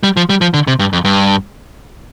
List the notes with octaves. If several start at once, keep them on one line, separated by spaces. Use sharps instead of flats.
G3
F3
G3
F3
D3
C3
G2
F2
G2